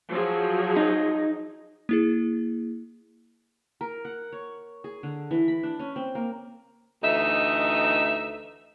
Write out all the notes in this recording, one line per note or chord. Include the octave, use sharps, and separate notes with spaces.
F3 F#3 G#4
D#4
A#3 E4 G#4
A#4
F#5
C#5
G#4
D3
E3
B5
D4
C#4
C4
A#3
D2 E3 D#4 D#5 E5